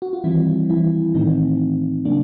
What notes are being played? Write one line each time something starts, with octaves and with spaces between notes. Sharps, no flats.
F#4
F4
D#3 E3 G3 C4 E4
E3 E4
A2 D#3 E3 A3 C4 D#4
C#3 F#3 A#3 D4